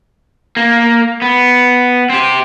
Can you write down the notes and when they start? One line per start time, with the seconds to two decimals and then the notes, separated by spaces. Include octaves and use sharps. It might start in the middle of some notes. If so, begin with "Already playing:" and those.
0.57 A#3
1.22 B3
2.10 C4 G4